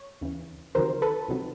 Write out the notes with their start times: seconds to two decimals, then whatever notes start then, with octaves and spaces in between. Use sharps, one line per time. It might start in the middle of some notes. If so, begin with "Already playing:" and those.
Already playing: C#5
0.21 D#2 C#3 E3
0.75 C#2 C3 D#3 F#3 A#4 C5
1.02 A4 B4
1.28 C#2 C3 D#3 F#3